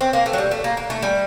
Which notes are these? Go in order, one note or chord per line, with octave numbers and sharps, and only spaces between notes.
C4
A#3
A3
F#3
G3
A3
A#3
A#3
A3
G3